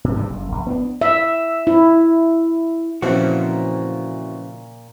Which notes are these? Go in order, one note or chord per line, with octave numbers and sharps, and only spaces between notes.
A#2
G2 C3 E3 G3
F#1
A#1
B3 C4 D4
E5
E4
A#2 C#3 E3 F3 C4 E4 F#4